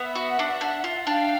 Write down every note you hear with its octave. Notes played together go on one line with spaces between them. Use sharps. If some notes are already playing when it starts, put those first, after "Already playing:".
Already playing: B3 E5 F#5
F#4
D4
D4
F4
D4 F5 G5